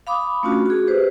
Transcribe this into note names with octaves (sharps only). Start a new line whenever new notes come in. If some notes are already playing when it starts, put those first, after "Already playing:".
F5 B5 D6 D#6
A3 C#4 D4 F4 F#4
F#4 G#4
G4 B4 C5